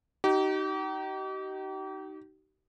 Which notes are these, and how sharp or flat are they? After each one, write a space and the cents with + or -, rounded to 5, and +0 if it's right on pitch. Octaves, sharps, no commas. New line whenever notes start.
D#4 +0 G4 -40